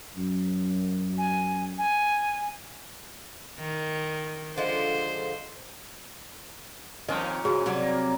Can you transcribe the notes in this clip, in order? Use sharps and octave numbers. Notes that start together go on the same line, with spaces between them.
F#2
G#5
G#5
D#3
D3 F3 G#3 C5
A#2 D#3 F3 C4 C#4 D#5
C#3 F#4 G#4
C3 F#3 G3
A#3